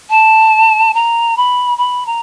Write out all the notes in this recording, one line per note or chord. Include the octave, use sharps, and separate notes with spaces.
A5
A#5
B5
B5
A#5